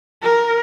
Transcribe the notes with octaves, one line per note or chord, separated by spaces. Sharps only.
A#4